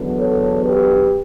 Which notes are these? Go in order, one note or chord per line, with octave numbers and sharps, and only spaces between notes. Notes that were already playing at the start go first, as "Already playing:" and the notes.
Already playing: E2 D3 F#3 B3
A4 C#5
G4 B4